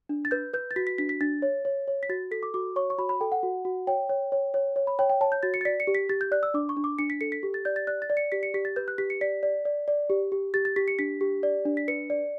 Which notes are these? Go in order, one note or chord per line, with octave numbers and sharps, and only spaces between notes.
D4
A6
B4 G6
B4 G6
A6
F#4 B6
B6
D4 B6
B6
D4 A6
C#5
C#5
C#5
B6
F#4 A6
A4 B6
D6
F#4 D6
C#5 C#6
C#6
F#4 B5
B5
A4 G5
F#5
F#4
F#4
C#5 G5
C#5
C#5
C#5
C#5
B5
C#5 G5
G5
C#5 A5
G6
F#4 A6
C#7
A6
D5 B6
C#7
G4
B6
G4 A6
G6
D5 F#6
E6
D4 D6
C#6
D4
D6
D4 C#7
B6
A4 C#7
B6
G4
A6
D5 G6
A6
D5 F#6
A6
D5
C#7
G4 B6
C#7
G4 B6
A6
B4 G6
F#6
G4 B6
C#7
D5 B6
D5
D5
D5
G4
G4
G4 A6
A6
G4 B6
C#7
D4 B6
G4
D5
D4
B6
B4 C#7
D5